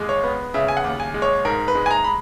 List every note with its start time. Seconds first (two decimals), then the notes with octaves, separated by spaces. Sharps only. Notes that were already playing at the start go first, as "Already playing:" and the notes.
Already playing: D#2 G#3
0.09 C#5
0.24 B3
0.54 C#3 E5
0.68 G#5
0.77 F#5
0.84 D#2
1.00 G#5
1.14 G#3
1.22 C#5
1.45 G#2 A#4
1.68 B4
1.75 G#3
1.86 G#5
1.91 A#5
2.04 B5